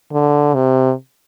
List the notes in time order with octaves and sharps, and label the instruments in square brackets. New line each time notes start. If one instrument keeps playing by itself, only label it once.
[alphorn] D3
C3